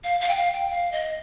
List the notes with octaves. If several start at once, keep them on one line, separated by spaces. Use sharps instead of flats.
F5
F5
G5
F5
G5
F5
D#5